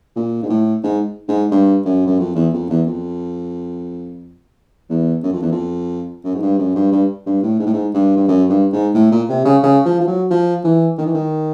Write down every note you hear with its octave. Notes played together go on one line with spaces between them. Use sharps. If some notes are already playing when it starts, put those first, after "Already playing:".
A#2
G#2
A2
G#2
G#2
G2
F#2
F#2
F2
E2
F2
E2
F2
E2
F#2
F2
E2
F2
F#2
G#2
G2
F#2
G2
G2
G2
A2
G#2
A2
G#2
G2
G2
F#2
G2
G#2
A2
A#2
C3
C#3
C#3
F3
F3
F#3
F3
E3
D#3
E3
D#3